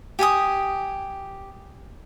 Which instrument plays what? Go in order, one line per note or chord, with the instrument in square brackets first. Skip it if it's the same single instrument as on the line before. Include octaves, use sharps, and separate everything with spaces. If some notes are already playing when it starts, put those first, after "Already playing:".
[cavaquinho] G4 G#5 A5 D#6